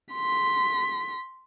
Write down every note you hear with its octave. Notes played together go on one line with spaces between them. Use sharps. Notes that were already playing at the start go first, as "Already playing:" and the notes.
C6 B6